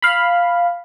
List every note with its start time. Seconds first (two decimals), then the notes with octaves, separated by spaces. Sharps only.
0.02 F5 B5